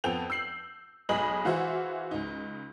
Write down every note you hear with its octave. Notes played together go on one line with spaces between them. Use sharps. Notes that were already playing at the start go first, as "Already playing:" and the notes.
F2 B3 C4 A4 G5 F7
E6 G6 C7 F#7
B1 G#3 D#5 G#5 B5 F#7
E3 F4 F#4 G#4 C5 E5
C#2 D#4